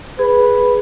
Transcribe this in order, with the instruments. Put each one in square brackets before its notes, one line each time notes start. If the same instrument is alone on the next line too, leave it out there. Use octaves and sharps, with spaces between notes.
[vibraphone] G#4 [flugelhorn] B4